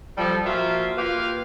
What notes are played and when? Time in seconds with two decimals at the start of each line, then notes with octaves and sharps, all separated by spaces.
0.16 F3 G3 A4
0.45 A#2 F3 F4 F#4 A#4 E5
0.97 A#3 F4 G4 B4 F5